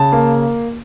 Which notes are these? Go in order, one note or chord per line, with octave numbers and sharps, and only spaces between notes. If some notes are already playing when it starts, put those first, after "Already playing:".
Already playing: C#3 A5
A#3